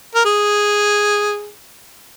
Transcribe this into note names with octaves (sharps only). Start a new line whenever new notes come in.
A#4
G#4